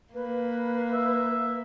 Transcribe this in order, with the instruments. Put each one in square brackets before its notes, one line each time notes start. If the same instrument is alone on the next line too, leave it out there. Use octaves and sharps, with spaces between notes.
[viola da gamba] A#3 [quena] B4
[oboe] E5